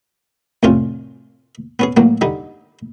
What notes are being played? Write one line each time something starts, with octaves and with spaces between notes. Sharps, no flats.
C2 F2 A2 C#4 F4
B3 C#4 G#4
A1 F#3 A#3
D3 G3 D#4